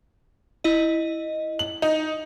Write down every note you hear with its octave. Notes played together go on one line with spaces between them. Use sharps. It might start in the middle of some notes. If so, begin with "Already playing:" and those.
E4 D#5
F#7
D#4